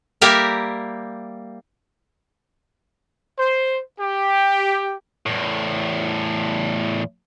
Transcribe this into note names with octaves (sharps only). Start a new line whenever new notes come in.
G3 A#3 G4 A#4 E5
C5
G4
E2 A2